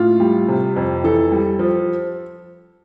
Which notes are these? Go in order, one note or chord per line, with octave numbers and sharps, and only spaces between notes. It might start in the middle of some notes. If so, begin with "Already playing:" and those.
Already playing: A2 F4
G3
C3
F2
E3 A4
G3
F3